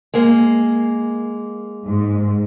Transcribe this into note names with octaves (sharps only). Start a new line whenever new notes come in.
G#3 A#3
G#2